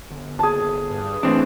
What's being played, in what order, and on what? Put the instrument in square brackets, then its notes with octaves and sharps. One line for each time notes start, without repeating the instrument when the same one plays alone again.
[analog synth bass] G1
[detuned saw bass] F#1 [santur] G#4 A5
[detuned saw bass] G2
[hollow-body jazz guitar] A2 C4 D4 [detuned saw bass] E3